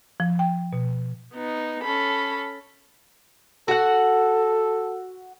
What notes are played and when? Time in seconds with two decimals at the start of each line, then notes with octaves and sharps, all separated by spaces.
0.20 F3
0.39 G5
0.73 B2
1.34 B3 D#4
1.83 C#4 A4 B5
3.68 F#4 A4 F#5